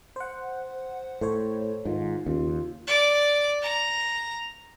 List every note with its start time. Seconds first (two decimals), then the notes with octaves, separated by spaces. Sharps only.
0.16 C5 F#5
1.21 A2 A4 C5 C#5
1.85 G#2 D#3 F4
2.26 D#2 C#3 F4
2.87 D5
3.62 A#5